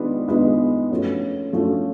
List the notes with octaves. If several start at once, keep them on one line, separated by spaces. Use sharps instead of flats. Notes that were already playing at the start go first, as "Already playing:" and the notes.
Already playing: D#3 G#3 B3 D4 F4
D#3 G#3 B3 D4 F4
F3 A3 C#4 F#4
F3 A3 C#4 F#4